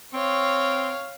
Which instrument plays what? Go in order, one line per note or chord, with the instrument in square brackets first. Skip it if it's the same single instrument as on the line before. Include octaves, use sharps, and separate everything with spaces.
[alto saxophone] C4 [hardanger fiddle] C#5 F5